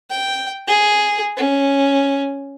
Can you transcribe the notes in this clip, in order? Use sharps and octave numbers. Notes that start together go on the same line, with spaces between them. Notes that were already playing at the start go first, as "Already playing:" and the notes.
G5
G#4
C#4